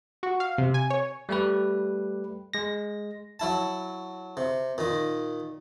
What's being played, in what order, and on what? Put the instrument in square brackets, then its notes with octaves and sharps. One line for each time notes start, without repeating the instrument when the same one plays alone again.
[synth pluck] F#4
F5
C3
G#5
C#5
[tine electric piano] G3 A3 G4 B4
G#3 A#6
[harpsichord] F#3 E4 A5
C3
A#2 D#3